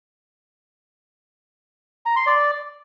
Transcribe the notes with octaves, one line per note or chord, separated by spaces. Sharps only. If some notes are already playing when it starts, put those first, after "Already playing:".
A#5
C6
D5